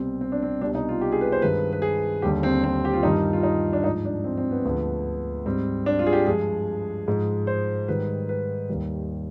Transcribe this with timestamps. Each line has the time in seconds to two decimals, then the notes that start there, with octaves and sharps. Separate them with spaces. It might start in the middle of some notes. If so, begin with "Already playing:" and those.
Already playing: C2 B2 G3 C4
0.21 C4
0.32 D4
0.43 C4
0.61 C2 B2 G3 D4
0.75 D#4
0.89 F4
1.01 G4
1.12 G#4
1.21 B4
1.32 C5
1.42 G2 D#3 G#3 B4
1.73 B4
1.82 G#4
2.22 D#2 D3 G3 G4
2.43 C4
2.64 C4
2.85 G4
2.94 F4
3.03 G2 D#3 G3 D#4
3.33 F4
3.43 D#4
3.73 D4
3.84 G#2 F3 G#3 D#4
4.05 D4
4.24 C4
4.37 C4
4.51 B3
4.65 D2 D3 F3 G#3 B3
5.45 G#2 G3 C4
5.86 D4
5.99 F4
6.06 G#4
6.13 G4
6.27 G2 F3 G#3 G#4
7.07 G#2 F3 G#3
7.47 C5
7.88 G#2 D#3 G3 B4
8.29 B4
8.69 D#2 D#3 G3